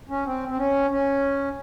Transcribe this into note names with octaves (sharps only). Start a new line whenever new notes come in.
C#4
C4
C4
C#4
C#4